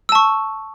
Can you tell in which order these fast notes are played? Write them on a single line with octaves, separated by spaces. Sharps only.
E6 A5 C#6